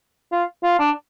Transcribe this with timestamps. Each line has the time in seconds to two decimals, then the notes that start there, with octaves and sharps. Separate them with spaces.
0.32 F4
0.63 F4
0.79 D4